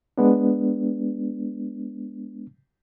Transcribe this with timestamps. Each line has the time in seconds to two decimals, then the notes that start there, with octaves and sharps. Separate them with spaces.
0.18 G#3 B3 D4